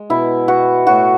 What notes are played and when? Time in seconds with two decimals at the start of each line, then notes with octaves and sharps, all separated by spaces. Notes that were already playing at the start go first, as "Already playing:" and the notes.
Already playing: G#3
0.10 B2 E4
0.48 B2 F#4
0.87 A2 F#4